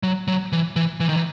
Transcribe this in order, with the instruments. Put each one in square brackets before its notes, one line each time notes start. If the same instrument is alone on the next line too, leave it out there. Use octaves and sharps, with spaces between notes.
[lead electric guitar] F#3
F#3
E3
E3
E3
D#3
E3